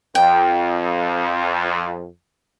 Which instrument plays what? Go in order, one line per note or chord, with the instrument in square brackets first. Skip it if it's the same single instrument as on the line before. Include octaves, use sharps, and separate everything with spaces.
[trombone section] F2 [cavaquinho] G5